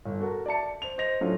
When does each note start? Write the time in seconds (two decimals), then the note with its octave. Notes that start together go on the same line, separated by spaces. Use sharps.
0.06 G1
0.20 F#4 A4 A#4
0.46 D5 E5 A5 C#7
0.82 C5 F7
0.98 C5 D#5 A#6 F7
1.21 A2 F#3 C#4 D4 F4